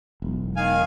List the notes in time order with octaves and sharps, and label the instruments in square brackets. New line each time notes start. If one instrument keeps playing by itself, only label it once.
[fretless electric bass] E1 B1
[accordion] D#3 F5 G#5